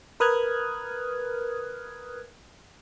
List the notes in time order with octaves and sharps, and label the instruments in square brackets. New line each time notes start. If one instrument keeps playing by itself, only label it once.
[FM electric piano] A#4 B4 D#6 F6 F#6 G#6